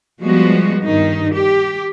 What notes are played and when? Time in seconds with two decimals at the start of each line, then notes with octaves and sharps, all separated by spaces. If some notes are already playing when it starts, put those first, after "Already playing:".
0.22 F3 G3 G#3 B3 F#4
0.83 G2 D#3 D#4
1.33 G4